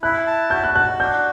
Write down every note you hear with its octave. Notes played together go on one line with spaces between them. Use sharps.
E4 F#6
A5
F#4 G6
F#6
F#4 F#6
D4 G6